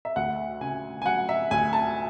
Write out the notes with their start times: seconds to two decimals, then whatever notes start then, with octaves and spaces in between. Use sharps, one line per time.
0.05 E5
0.16 D2 F#5
0.61 C#3 G#5
1.02 G#5
1.06 F#3 F#5
1.29 E5
1.51 D2 G#5
1.73 A5